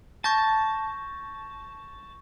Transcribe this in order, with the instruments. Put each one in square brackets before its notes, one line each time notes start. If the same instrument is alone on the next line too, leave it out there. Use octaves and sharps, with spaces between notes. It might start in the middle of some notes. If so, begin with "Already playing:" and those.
[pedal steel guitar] A5 [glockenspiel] C#6 G6 A#6